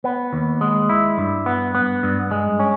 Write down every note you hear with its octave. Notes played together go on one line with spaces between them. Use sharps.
B3
D#2
G#3
E4
G2
B3
B3
G2
G#3
C#4